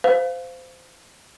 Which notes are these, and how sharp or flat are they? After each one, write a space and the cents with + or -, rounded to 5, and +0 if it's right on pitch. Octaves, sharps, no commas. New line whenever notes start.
C5 -20 F5 +0